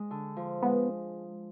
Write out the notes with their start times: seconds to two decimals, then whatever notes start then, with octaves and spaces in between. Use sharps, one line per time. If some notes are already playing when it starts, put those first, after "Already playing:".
Already playing: G#3
0.11 D3
0.37 F3
0.62 G#3 B3